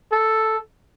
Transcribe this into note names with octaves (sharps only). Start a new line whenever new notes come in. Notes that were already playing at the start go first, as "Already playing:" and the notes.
A4